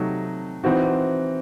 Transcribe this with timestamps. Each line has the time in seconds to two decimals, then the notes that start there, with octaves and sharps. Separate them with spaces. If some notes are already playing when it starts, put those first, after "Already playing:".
Already playing: C3 F#3 A3 D#4
0.64 E3 C4 D#4 F#4